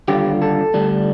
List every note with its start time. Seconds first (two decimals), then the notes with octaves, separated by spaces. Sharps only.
0.08 D#2 D3 G3 D4 F4 G4
0.42 A4
0.74 D2 D3 G3 D4